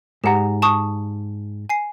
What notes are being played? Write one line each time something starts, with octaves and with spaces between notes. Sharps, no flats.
G#2 G4 G#4 F#5 A#5
A5 C#6 D#6
G#5 C7